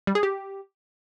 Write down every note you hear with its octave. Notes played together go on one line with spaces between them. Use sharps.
G3
G#4
G4